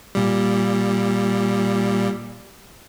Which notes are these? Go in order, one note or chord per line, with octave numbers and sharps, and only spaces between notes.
A#2 G3